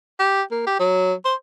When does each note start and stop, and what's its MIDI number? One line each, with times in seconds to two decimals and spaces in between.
0.19 0.42 67
0.51 0.66 58
0.67 0.76 67
0.80 1.13 54
1.25 1.34 72